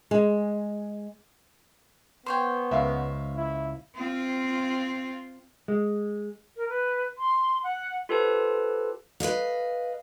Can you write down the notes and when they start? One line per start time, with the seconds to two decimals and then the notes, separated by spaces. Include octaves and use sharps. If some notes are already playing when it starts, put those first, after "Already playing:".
0.11 G#3
2.26 B3 C5 C#5 G5
2.71 C#2 E5 F5
3.36 E4
3.95 C4 F4
5.68 G#3
6.57 A#4
6.69 B4
7.18 C6
7.64 F#5
8.09 F4 G4 A4 B4 C5 A5
9.20 B4 D5 D#5 F5